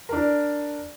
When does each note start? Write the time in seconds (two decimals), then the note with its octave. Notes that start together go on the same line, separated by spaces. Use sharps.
0.09 D4 A#4